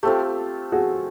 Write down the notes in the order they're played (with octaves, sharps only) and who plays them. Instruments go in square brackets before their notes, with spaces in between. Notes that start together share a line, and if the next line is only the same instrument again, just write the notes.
[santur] A3 C4 F4 [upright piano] G4 A4
[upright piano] F#4 G#4